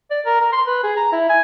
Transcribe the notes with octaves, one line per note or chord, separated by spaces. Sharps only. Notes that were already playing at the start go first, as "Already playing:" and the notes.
D5
A#4
A#4
C6
B4
G#4
A#5
E4
G#5